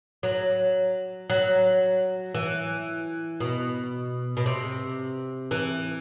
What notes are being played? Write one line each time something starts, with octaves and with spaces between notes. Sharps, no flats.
F#3
F#3
E3
B2
B2
C3
E3